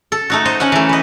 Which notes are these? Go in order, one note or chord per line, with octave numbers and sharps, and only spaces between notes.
A4
A3 D#4 F#4
C5 D#5 A#5
C#4 D#5 F#5
E3 A3
B4 D#5